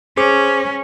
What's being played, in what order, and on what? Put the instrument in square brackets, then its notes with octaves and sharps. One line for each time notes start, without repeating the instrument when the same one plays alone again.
[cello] C#4 [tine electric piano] G#4 C5 D6